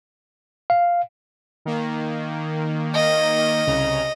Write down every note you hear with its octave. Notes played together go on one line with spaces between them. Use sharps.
F5
D#3 A#3
D#5
C2 C#3 A#5